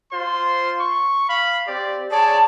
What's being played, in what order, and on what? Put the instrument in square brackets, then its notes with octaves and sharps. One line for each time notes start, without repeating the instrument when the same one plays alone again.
[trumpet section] F4 C5 C6
C#6
F5 B5
C4 G4 D5
[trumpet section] G#4 C#5 D5 [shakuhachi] A5